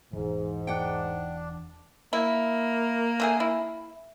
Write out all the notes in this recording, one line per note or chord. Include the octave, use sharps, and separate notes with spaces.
E1 G#2 E3
D4 F#5 G5
A#3 E4
D3 A3 G#4
E4